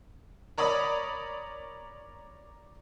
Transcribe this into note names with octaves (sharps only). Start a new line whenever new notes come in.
A#4 C#5 D5 B5 D#6